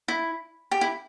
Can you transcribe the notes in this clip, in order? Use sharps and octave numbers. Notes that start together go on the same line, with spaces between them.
E4
G4
E4